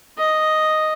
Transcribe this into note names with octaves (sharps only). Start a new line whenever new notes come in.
D#5